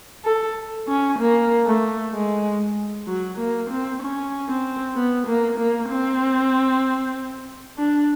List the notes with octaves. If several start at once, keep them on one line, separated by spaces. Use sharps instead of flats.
A4
C#4
A#3
A3
G#3
F#3
A#3
C4
C#4
C4
B3
A#3
A#3
C4
D4